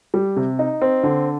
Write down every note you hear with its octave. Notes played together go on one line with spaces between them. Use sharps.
G3
C3
D#4
C4
D3